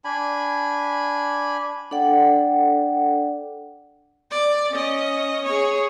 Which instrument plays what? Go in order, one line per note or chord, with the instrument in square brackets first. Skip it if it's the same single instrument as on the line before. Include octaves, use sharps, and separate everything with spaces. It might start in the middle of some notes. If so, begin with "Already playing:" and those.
[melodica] D4 G#5 B5
[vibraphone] D4 A4 D5 F#5 G5
[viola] D5
C#4 D#5
G#4 C#5